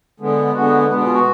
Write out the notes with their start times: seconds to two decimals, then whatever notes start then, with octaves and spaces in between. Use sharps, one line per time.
0.20 D3 G#3 B3
0.54 D3 G#3 B3 F#4
0.88 B2 G#3 B3 B4
0.97 D4
1.06 F4
1.14 F#4